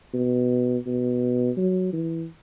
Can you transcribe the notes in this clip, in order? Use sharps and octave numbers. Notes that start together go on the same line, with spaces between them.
B2
B2
F#3
E3